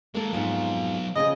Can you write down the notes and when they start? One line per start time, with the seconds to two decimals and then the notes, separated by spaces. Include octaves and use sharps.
0.15 G#3 A#3 A4 A#4
0.33 F2 G#2 F#3 B3 F4
1.16 C#3 F3 G#4 D#5